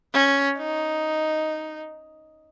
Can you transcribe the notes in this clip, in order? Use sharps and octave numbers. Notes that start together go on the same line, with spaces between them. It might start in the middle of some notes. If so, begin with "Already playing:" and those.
C#4
D#4